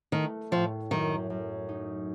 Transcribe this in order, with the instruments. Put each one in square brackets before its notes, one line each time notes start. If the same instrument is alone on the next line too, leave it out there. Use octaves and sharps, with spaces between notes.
[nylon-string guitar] D#3 [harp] A3
[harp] A2 [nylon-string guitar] F3
[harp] F#2 [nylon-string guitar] D#3
[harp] F#2
D#4